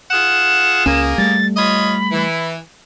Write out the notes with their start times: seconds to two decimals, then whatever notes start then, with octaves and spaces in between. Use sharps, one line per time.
0.10 F4 G#4 F#5 E7
0.86 C#2 A#3 C#4 G#4
1.18 G3 A3 A6
1.57 F4 C#5 D#5 B5
2.12 E3